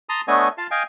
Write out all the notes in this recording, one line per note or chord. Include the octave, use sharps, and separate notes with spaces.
A5 A#5 C6 D#6
A3 B3 D4 C#5 D#5 G#5
F4 F5 A5
D#5 F5 G5 G#5